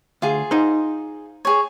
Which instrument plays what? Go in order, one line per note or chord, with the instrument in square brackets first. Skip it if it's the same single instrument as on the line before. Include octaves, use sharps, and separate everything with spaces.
[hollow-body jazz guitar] D2 [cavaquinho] F4 G#4
[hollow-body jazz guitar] D#4 C5
[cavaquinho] G#4 C#5